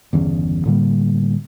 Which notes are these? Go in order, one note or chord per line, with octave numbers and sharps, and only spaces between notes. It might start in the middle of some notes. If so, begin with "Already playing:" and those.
G1 E2 C#3
A2 D3 G3 A#3